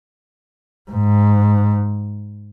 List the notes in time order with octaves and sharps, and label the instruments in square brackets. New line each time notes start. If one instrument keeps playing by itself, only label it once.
[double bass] G#2